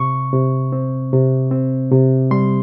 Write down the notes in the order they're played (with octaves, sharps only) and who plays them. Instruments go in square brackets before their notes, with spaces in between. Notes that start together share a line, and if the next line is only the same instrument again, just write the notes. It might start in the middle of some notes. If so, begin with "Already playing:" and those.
Already playing: [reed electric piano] C3 C#6
C3
C4
C3
C4
C3
G3 C6